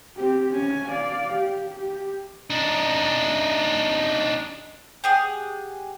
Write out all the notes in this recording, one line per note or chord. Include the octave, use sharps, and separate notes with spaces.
C4 G4
C#4 G#5
D5 F5
G4
G4
D4 D#4
G4 G#4 F#5